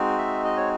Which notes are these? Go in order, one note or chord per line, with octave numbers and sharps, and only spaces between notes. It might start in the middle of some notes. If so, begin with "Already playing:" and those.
Already playing: G#3 C4 D#4 F#4
E5
D#5
C#5